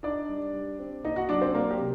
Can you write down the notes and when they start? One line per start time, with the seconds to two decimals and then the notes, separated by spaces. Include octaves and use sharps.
0.03 D4 D#4 D5
0.29 G3
0.53 G3
0.79 C4
1.04 A#3 D#4 D#5
1.16 F#4 F#5
1.29 F#3 D4 D5
1.42 C4 C5
1.55 F#3 A#3 A#4
1.71 G4
1.79 C3